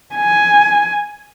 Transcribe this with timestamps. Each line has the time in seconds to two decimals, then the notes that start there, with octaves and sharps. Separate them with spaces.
0.15 G#5